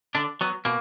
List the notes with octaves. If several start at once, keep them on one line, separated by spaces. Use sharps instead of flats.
D3 D4
F#3 B3
B2 A#3